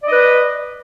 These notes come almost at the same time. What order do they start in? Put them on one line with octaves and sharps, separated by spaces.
D5 D#5 B4